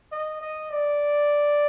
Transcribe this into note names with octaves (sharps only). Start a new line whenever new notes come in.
D#5
D#5
D5